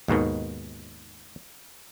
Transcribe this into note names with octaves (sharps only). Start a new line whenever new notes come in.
D#2 G#2 B2 D#3